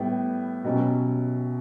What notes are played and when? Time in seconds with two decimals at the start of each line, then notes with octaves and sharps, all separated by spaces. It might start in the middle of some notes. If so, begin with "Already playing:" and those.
Already playing: A2 G3 B3
0.64 B2 F#3 C#4 G4